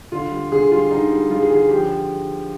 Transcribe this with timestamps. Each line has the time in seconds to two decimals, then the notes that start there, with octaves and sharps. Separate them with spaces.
0.12 D3 F4
0.31 G3
0.52 D3 G#4
0.72 G3 F4
0.91 D3 D#4
1.11 G3
1.30 G3 F4
1.40 G#4
1.50 D3 G#4
1.70 F3 G4